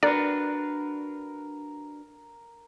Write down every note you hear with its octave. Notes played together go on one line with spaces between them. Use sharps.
D4 F#4 A#4 B4 D5